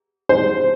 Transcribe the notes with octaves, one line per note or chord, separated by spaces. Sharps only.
C5